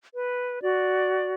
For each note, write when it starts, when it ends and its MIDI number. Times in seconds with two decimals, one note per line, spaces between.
0.14 0.62 71
0.62 1.34 66
0.62 1.34 74